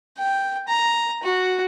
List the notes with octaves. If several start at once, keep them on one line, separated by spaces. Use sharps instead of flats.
G5
A#5
F#4